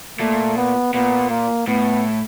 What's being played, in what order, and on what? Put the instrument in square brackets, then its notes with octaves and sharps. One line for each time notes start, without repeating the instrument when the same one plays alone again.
[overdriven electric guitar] A#2 [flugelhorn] A3
[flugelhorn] B3
[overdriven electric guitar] A#2 [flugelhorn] B3
[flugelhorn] A#3
[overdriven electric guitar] A2 [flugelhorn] B3